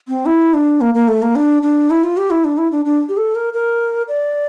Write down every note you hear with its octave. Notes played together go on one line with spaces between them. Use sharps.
C4
E4
D4
A#3
A#3
A3
A#3
D4
D4
E4
F4
G4
E4
D4
E4
D4
D4
G4
A4
A#4
A#4
D5